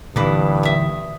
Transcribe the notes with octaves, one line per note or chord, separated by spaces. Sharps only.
D2 G2 A#2 E3 B4 D6 D#6
E5 D#6